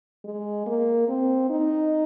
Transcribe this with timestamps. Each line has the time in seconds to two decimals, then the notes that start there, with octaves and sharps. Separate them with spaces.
0.24 G#3
0.66 A#3
1.08 C4
1.50 D#4